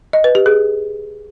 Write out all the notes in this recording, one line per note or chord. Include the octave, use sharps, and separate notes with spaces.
D#5
B4
G4
G#4